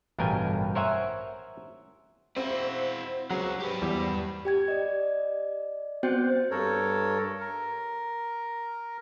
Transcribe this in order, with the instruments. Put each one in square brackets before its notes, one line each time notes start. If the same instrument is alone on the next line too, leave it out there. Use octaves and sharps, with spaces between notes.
[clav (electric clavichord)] A1 G2 B2 A#4 G5 G#5
A#4 C5 C#5 E5 F#5 G#5
[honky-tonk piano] C4 [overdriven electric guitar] E4 F#4
[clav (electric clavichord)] F#3 F#5 A#5 [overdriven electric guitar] G#3 C#4
[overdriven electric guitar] G4 B4
[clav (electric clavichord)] E2 G3
[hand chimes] G4 G5 G#6
D5 D#5
B3 C4 F#4 C5 G5 G6
[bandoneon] G2 A4 A#4 C#5
A#4